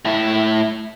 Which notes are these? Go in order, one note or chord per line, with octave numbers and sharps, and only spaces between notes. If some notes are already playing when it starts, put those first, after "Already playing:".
A2 E4